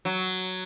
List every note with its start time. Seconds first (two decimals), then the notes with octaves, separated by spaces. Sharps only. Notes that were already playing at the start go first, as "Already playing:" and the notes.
0.05 F#3